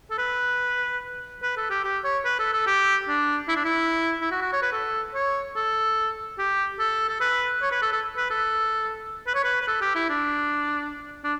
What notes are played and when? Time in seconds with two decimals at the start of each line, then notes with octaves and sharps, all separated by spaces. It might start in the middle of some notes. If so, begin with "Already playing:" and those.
0.11 A4
0.18 B4
1.42 B4
1.57 A4
1.70 G4
1.84 G4
2.04 C#5
2.25 B4
2.39 A4
2.53 A4
2.67 G4
3.08 D4
3.48 E4
3.56 D4
3.65 E4
4.21 E4
4.31 F#4
4.42 F#4
4.53 C#5
4.62 B4
4.72 A4
5.14 C#5
5.56 A4
6.38 G4
6.79 A4
7.09 A4
7.21 B4
7.62 C#5
7.71 B4
7.82 A4
7.92 A4
8.17 B4
8.30 A4
9.27 B4
9.35 C#5
9.44 B4
9.62 B4
9.68 A4
9.81 G4
9.95 E4
10.09 D4
11.24 D4